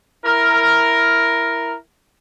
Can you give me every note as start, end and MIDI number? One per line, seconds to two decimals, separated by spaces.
0.25 1.75 64
0.25 1.75 70